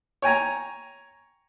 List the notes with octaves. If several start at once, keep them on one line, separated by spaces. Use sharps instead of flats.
C#5 G5 G#5 A#5